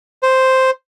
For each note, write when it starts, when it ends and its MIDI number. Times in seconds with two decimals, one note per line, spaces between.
0.23 0.70 72